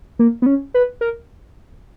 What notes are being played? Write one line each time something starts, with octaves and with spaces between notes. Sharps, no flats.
A#3
B3
C#4
B4
A#4